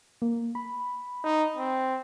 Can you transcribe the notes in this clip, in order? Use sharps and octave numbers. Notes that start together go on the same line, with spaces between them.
A#3
B5
D#4
C4